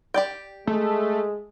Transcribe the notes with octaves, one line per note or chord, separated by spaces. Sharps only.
G4 D5 G5
G#3 A3